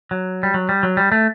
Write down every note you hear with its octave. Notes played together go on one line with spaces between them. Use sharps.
F#3
G3
F#3
G3
F#3
G3
A3